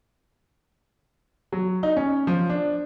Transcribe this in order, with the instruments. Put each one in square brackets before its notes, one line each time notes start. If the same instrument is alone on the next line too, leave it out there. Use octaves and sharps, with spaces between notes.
[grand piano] F#3
D#4
C#4
F3
D4